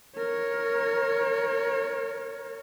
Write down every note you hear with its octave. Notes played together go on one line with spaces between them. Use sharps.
A#4 C#5